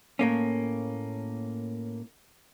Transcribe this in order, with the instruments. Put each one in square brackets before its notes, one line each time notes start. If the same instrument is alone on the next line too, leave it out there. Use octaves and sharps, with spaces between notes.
[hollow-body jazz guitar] A2 A#3 C#4